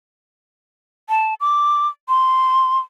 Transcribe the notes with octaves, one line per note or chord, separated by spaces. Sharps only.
A5
D6
C6